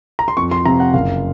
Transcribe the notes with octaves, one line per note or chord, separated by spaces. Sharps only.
A#5
C6
F2 C#6
C6
C3 F3 A#5
F#5
F#1 F5